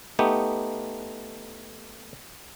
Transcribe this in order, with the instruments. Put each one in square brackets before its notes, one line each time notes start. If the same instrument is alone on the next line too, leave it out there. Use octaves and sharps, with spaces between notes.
[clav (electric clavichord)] A3 B3 D#4 G4